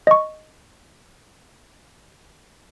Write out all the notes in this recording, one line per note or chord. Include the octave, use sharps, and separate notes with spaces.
D#5 C#6